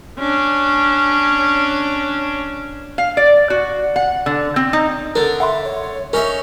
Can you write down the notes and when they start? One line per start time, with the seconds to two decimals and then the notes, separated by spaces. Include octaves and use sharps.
0.19 C#4 D4
2.98 F5
3.17 D5
3.50 F#4
3.96 F#5
4.26 D3
4.56 C4
4.73 D#4
5.16 D3 D4 A#4
5.40 E5 F#5 B5 C6
5.64 C#5
6.13 C#4 D#4 A#4 E5 C#6 F6